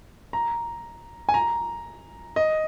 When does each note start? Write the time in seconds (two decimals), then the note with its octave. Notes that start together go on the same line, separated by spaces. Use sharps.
0.33 A#5
1.29 G#5
1.34 A#5
2.36 D#5